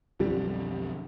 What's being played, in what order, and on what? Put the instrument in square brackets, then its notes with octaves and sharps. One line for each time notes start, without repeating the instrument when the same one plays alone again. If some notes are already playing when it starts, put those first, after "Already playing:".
[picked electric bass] B1 F2 D3 [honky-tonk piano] G3